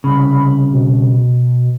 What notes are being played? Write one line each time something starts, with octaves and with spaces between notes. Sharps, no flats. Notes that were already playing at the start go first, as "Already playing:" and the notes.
C2 C#3 B5
B2